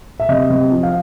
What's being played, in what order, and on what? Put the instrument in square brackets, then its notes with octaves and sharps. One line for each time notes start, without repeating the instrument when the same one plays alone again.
[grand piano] E5
C3 D#5
C3
F3
F5